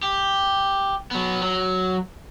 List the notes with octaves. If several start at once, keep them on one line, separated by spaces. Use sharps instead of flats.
G4
F#3 B3
F#3